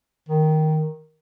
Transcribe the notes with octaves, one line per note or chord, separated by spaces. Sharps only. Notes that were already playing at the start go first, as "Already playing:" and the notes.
D#3